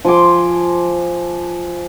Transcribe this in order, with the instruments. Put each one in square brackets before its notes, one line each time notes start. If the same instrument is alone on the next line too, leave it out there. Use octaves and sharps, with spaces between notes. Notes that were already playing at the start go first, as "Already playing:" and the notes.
[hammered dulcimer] F3 G#5 C6 D6